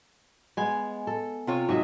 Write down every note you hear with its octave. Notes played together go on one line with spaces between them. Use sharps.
G#3 B3 G#5
A4
C3 F4 C#5
G#2 F#3 D#5 E5